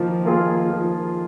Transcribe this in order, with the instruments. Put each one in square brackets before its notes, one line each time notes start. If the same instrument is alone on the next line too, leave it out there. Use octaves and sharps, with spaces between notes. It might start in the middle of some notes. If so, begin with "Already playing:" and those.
Already playing: [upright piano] D#3 [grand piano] F3 A#3 F4
[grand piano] A#3 F4 G#4
F3